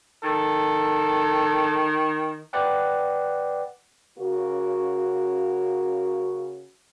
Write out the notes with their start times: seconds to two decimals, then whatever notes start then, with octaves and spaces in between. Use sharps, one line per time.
0.24 D#3 A4
2.53 B4 D5 F#5 G5
4.18 C#3 A#3 C#4 F#4